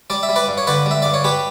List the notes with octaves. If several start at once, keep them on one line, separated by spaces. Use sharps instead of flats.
G3 D5
E5
G3
B4 D5
G2
C#5
D3 B4 D5
G3 E5
G2 D5
C#5
G3 G4 B4